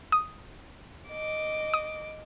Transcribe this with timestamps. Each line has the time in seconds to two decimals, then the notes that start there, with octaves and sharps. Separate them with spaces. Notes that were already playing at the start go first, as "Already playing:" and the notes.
0.12 D#6
1.08 D#5 D6
1.74 D#6